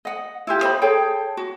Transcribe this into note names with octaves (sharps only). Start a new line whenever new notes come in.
D#5 F#5
E4 F4 G4
C5 D#5 B5
G#4 A4 C#5 G5
F#4